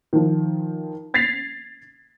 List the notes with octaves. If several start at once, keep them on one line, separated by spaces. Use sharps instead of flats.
D#3 F3
G#6 A6 B6 C7 F7